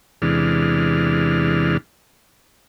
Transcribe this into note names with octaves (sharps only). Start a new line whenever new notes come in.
E2 C3 E3 G#3 D4 F6